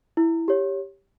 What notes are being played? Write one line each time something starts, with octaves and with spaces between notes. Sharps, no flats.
E4
G4 C#5